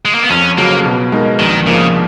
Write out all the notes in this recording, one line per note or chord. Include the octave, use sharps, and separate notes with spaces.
G#3
A#3
B3
F2 C#4
C#3 F#3 A#3
B2
G#3 D#4 A#4
A#1 D#3
G#2 C#3 F3 A#3